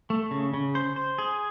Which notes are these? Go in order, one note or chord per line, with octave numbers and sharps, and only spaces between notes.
A3
C#3
C#3
C5
C5
G#4